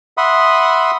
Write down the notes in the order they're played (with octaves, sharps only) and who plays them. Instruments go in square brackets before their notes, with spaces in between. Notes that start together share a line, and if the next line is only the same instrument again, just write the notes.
[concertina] E5 F#5 B5 C6 D#6